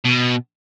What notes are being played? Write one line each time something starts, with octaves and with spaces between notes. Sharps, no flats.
B2